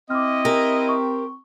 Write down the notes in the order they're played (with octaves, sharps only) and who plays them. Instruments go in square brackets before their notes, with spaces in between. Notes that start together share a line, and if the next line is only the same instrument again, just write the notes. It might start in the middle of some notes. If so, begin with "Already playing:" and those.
[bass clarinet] C4 [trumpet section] E4 D#5 [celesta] D6 F6
[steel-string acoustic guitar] G4 A#4 [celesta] A#6
[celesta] C#6